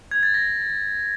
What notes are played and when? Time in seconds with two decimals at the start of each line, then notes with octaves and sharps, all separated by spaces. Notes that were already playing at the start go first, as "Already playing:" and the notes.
0.11 G#6
0.23 A6
0.34 A#6